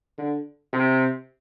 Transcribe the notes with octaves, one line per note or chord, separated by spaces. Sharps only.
D3
C3